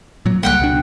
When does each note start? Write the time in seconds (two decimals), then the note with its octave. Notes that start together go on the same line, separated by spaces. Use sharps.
0.26 A#2 F#3
0.43 C#2 G3 A#3 F#5 G5 F#6
0.59 C#2 B2 D4